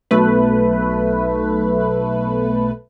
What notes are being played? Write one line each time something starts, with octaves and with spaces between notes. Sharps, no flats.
B1 A3 B4